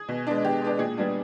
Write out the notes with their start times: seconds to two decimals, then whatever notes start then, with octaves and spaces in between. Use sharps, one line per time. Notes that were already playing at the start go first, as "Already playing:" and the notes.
Already playing: G#4
0.08 B2
0.27 G#3 B3 D4
0.45 B2 G4
0.61 G#3 B3 D4
0.79 A#2 G#4
0.97 G3 B3 D4